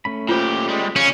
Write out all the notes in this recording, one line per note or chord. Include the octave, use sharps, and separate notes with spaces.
A3 C#4 B5
A#2 F4 G4 B4 C5
G3 G#3
C#3 C#4